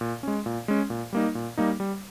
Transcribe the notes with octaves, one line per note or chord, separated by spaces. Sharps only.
A#2
G#3 C#4
A#2
G#3 C#4
A#2
G3 A#3 D#4
A#2
G3 A#3 D#4
G3